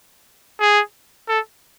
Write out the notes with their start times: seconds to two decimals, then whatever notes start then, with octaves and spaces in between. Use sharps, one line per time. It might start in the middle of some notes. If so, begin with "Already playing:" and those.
0.60 G#4
1.29 A4